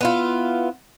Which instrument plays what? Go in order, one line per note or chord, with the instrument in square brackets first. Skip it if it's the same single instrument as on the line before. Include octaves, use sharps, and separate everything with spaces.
[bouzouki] B3 E4 F4